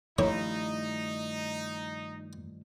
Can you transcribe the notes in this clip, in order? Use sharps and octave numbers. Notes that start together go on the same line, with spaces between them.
G2 D#3 F3 A3 D#4 E4 C#5